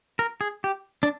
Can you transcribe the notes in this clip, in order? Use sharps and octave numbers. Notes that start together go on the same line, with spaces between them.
A#4
G#4
G4
D4